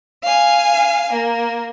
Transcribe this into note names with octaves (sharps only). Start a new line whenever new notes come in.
F5 G#5
A#3